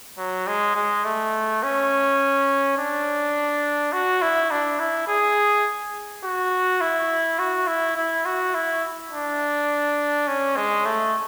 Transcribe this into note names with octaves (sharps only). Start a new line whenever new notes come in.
F#3
G#3
G#3
A3
C#4
D4
F#4
E4
D4
E4
G#4
F#4
E4
F#4
E4
E4
F#4
E4
D4
C#4
G#3
A3